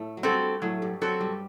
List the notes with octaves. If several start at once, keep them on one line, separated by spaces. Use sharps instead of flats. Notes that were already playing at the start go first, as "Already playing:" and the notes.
Already playing: A2 A3
F#3
G2 G3 C4 F#4 A4
A2 F#3 A3
G2 G3
F#3 C4 F#4 A4
G2 G3